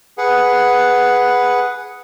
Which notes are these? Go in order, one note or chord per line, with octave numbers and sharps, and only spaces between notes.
G#4 B4 F#5